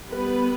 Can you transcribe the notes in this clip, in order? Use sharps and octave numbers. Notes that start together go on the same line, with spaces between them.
G3 B3 B4